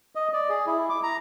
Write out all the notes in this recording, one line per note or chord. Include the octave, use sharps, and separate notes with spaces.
D#5
D5
G#4
E4
D6
A#5